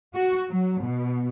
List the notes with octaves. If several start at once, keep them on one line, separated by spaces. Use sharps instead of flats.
F#4
F#3
B2